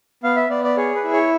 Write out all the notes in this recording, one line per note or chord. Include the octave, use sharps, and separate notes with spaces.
B3 F5
E5
B3 D5
D5
G#4 C#5
B4
E4
C#5